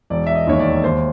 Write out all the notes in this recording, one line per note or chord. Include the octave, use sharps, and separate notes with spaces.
E1 D5
E5
D#5
D#2 D#3 C#5
D5
D#2 C5